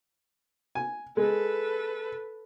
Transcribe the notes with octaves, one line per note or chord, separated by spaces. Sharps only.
G#5
G#3 A4 B4